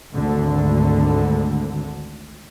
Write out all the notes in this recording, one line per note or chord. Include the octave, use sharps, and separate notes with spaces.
G#1 D2 D3